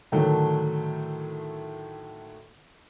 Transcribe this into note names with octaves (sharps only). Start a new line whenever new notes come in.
A2 D3 D#3 F#3 A3